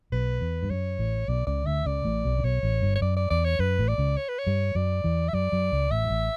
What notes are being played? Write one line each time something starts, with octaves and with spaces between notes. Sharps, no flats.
B1 B2 B4
E2
G2
F#2 C#5
A1 A2
B1 B2 D5
C#2 C#3 D5
D2 D3 E5
C#2 C#3 D5
A1 A2
B1 B2
C#3
B1 B2 C#5
A1 A2
G1 G2
C#5
F#2 D5
D5
E2 D5
C#5
F#2 B4
A1 A2
D5
C#2 C#3
C#5
B4
C#5
G2 G3
F#2 F#3 D5
E2 E3
E5
F#2 F#3 D5
F#2 F#3
C#2 C#3
A1 A2 E5
G2
A1 A2